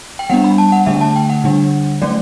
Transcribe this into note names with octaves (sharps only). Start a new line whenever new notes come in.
G5
G3 B3 D4 F#5
B5
A5
F#5
D3 A3 D4 E5
A5
G5
F#5
D3 G3 D4
F#3 A3 C#4 D5